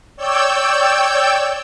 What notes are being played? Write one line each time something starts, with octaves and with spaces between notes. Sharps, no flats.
C#5 D5 G5 E6 G6